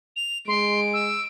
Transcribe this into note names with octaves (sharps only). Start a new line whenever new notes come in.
F7
G#3 C6 D7
E6